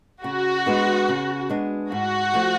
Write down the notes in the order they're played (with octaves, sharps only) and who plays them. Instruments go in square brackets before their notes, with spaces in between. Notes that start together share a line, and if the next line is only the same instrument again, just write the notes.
[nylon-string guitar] C#3 [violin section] F#4
[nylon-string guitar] G#3 B3 D4
C#3
G#3 B3 D4
[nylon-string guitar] G#2 [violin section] F#4
[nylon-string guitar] F3 A3